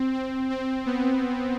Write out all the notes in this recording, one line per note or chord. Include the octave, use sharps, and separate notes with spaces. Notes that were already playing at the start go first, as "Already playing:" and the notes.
Already playing: C4
C4
C4
B3